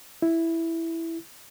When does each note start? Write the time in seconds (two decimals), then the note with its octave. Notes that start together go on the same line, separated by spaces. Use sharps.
0.22 E4